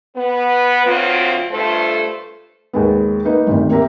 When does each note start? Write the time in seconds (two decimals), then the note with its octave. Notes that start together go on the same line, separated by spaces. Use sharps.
0.15 B3 B4
0.85 D2 F#3 C4 F4
1.51 G2 A3 F4 A4 C5
2.73 D#2 G#3 B3
3.25 A#3 B3 D#4 B4
3.47 G1 D2 C3 D#3
3.71 A#3 C4 G4 A#4 E5 A#5